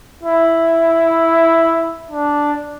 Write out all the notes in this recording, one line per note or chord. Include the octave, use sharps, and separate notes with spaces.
E4
D4